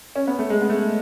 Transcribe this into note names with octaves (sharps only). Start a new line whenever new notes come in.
C#4
B3
A3
G#3
B3
A3